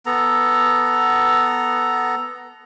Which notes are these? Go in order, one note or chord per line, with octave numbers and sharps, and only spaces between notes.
B3 A4 A#5